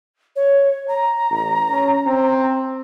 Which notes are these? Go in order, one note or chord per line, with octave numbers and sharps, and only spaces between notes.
C#5
A#5
A1
C#4
C4